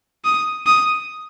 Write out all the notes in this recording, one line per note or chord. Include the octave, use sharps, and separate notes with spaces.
D#6
D#6